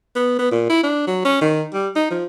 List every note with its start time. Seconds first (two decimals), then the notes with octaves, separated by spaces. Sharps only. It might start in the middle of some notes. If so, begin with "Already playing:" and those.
0.16 B3
0.39 B3
0.51 A#2
0.70 E4
0.84 D4
1.07 F#3
1.25 C#4
1.42 D#3
1.74 G3
1.96 D#4
2.11 F3